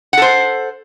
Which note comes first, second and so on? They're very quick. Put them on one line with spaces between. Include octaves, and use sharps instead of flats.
F#5 A4 C5